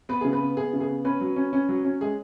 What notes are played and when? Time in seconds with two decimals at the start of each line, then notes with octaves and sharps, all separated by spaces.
0.09 B3 B4
0.21 C#3 G#4
0.33 B4
0.41 B3
0.57 B3 G#4
0.73 C#3
0.80 G#4
0.89 B3
1.05 C#4 B4
1.21 F#3
1.36 C#4
1.53 C#4
1.69 F#3
1.85 C#4
2.01 G#3 G#4